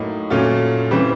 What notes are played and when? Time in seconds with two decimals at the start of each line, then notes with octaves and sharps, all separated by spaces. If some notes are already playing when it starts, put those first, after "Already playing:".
Already playing: A2 F#3 A#3 D#4
0.30 A#2 F#3 A3 C#4 F4
0.91 C#3 E3 G3 C4